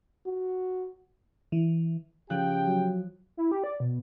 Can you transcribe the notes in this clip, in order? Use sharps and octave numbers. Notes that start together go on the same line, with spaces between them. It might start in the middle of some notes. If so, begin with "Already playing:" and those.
F#4
E3
C#3 F3 G4 G5 F#6
F#3
E4
G4
D5
B2